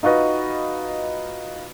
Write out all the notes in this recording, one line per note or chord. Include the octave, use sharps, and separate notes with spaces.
D#4 F4 F#4 B4 D#5